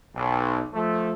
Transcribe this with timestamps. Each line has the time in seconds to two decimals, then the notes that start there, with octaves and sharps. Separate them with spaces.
0.15 B1
0.73 F3 A3